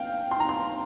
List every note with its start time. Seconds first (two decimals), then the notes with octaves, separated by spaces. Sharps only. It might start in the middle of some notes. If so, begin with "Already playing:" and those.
Already playing: F5 G5
0.31 C6
0.40 A#5
0.49 C6